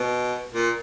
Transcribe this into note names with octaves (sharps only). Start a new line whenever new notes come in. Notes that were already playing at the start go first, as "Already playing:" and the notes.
Already playing: B2
A#2